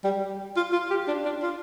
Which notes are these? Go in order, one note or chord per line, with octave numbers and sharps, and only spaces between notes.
G3
F4
F4
G4
D4
D4
F4